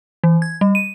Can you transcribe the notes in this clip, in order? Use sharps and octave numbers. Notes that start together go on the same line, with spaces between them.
E3
G#6
G3
D#7